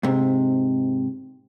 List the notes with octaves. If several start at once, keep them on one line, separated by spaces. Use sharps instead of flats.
G#2 C3